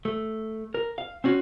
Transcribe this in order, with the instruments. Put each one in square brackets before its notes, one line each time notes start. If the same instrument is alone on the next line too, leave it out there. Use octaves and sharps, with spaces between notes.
[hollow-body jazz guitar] A3
A#4
F5
C4 C#4 F#4